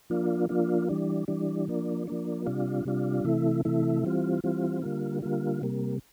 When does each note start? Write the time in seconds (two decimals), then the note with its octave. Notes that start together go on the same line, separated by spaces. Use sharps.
0.10 F3 A#3 D4 F4
0.49 F3 A#3 D4 F4
0.89 E3 G3 D4
1.28 E3 G3 D4
1.68 F3 A#3 D4
2.07 F3 A#3 D4
2.46 C3 G3 D4 F4
2.85 C3 G3 D4 F4
3.24 C3 E3 A3 E4
3.65 C3 E3 A3 E4
4.03 E3 G3 C4 F4
4.44 E3 G3 C4 F4
4.82 D3 G3 A#3 F4
5.22 D3 G3 A#3 F4
5.61 C3 G3 A#3